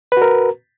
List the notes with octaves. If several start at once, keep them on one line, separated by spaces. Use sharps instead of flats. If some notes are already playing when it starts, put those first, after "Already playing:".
F#4 A#4 B4